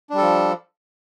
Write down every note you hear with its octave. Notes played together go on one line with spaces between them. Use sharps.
F3 G3 D4 A4